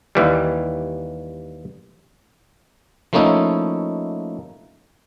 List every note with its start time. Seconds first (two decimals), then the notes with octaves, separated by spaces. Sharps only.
0.15 D#2 E3 G3
3.13 F3 A3 A#3 C#4 D#4 E4